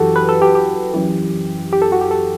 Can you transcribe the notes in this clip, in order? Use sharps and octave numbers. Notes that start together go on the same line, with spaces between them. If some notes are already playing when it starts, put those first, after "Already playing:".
Already playing: F#2 E3 F#4 G4 A4
B4
A4
G4
G4
F#2 E3
G4
A4
F#4
G4
A4